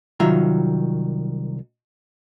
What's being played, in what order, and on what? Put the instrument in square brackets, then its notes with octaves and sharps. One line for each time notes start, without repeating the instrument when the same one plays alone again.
[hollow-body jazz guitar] C2 D#3 F#3 F4 E5 A#5